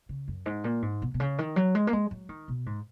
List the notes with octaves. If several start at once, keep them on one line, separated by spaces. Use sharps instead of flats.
C#3
F#2
G#2
A#2
G#2
B2
B2
C#3
D#3
F#3
G#3
A#3
G#3
F#3
D#3
B2
G#2